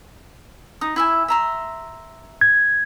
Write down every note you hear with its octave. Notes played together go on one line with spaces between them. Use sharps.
D#4 D#6
E4 E5 G#5
E5 A#5 C6
G#6